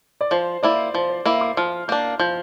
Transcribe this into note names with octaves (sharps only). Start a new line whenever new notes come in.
D5
F3 C5
A#3 E4 D5
F3 C5
C5
A#3 E4 E5
D6
F3 F6
A#3 D4 G6
F3 G6